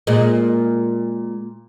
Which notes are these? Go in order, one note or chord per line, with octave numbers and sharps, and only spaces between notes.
A#2 G#3